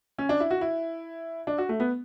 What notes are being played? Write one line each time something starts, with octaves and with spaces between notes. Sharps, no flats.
C#4
D4
E4
F#4
E4
D4
F#4
A3
B3